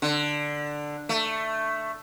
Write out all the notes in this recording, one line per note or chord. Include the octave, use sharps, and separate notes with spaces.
D3
A3